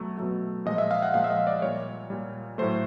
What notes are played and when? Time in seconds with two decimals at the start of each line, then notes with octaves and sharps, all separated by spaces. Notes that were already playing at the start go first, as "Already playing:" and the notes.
Already playing: B2 F#3 A3
0.17 B2 F#3 A3
0.65 A#2 F3 G#3 D#5
0.78 E5
0.91 F5
1.02 F#5
1.14 A#2 F3 G#3 F5
1.24 E5
1.30 D#5
1.47 D5
1.62 A#2 G3 C#5
2.10 A#2 G3
2.58 A2 F#3 A3 C5